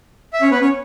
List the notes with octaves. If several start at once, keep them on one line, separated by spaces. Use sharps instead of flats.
E5
C#4 C#5
B3 B4
C#4 C#5